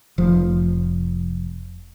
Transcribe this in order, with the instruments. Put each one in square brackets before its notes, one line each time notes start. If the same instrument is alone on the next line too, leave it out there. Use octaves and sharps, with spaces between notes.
[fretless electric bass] F1 F3